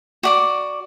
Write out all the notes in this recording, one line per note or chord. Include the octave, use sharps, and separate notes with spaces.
F#4 D5 D6